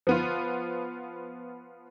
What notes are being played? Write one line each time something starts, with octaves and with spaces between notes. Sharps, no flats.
F3 B3 F4